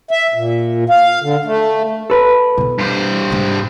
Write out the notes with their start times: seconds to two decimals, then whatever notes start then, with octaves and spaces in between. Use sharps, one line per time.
0.11 E5
0.34 A#2
0.90 F5
1.22 D3
1.45 A3
2.10 A4 B4
2.58 B2 E3
2.79 G2 C5
3.30 G#2 C3